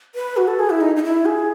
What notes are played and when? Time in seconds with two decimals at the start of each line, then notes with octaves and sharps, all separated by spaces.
0.15 B4
0.37 F#4
0.48 A4
0.59 G#4
0.70 E4
0.81 D#4
0.96 D#4
1.04 E4
1.25 G#4